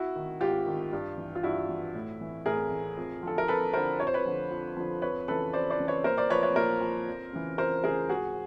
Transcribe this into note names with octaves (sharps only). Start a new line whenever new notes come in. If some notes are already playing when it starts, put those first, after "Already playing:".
Already playing: E4 F#4
D#3
G#2 F4 G4
D#3
G2
E3
F4
G2 E4 F#4
E3
A2
E3
A2 G#4 A#4
E3
F2
D3 F3 A4
A#4
F2 A4 B4
D3 F3 A#4 C5
F2 C#5
C5
B4 C#5
D3 F3
F2
D3 F3
F2 B4 C#5
C#3 E3 A4 B4
F2 C5 D5
C5 D5
C#3 E3
B4 C#5
A#2 A#4 C5
C5 D5
F3 B4 C#5
B4 C#5
A#2 A#4 C5
F3
F2
C#3 E3
F2 A#4 C5
C#3 E3 G#4 A#4
G#2 F#4 G#4